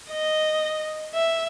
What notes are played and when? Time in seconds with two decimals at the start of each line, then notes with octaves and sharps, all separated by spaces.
0.11 D#5
1.14 E5